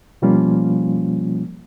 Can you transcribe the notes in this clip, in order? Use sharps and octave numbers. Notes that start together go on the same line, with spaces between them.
B2 F3 G3 A#3 C#4 F4